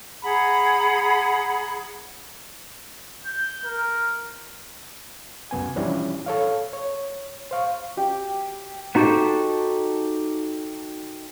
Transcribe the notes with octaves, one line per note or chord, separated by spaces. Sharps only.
G#4 F#5 A#5 B5
G6
A#4
C2 F#2 B3 G#5
E3 F3 G3 C#4 D4 E4
A4 C#5 F5
C#5
C5 F5 C#6
G4
B3 D#4 F#4 G4 A4 C5